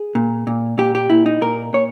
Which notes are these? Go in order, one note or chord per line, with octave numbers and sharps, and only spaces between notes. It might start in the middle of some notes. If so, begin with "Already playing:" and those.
Already playing: G#4
A#2
A#2
A#2 G4
G4
A#2 E4
D#4
A#2 A#4
A#2 C#5